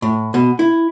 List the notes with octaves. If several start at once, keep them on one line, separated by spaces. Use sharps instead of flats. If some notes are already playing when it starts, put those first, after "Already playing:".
A2
B2
E4